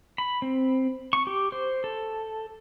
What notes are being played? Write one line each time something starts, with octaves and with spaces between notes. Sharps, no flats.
B5
C4
C#6
G4
C5
A4